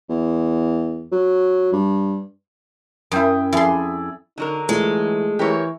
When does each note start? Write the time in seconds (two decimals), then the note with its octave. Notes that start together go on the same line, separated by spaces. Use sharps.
0.09 E2
1.12 F#3
1.73 G2
3.11 F#2 E4 G5 D#6
3.52 F2 E4 G#4 D5 C6
4.38 D3 F#3 D#4 A#4
4.69 E3 G#3 A3 F4
5.39 E3 G4 A#4 C#5